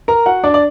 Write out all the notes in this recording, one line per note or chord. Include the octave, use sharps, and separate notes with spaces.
A#4 A#5
F#4 F#5
D4 D5
D5